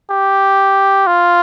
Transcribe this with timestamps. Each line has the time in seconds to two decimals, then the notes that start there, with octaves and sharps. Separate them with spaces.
0.10 G4
1.07 F4